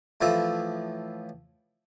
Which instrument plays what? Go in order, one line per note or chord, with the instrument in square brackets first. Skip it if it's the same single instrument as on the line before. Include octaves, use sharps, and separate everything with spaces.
[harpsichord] A2 E3 F3 E5